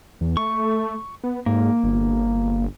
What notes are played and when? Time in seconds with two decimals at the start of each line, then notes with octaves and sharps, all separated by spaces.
0.21 E2
0.37 A3 C#6
1.24 B3
1.46 G#2 A#3
1.83 G1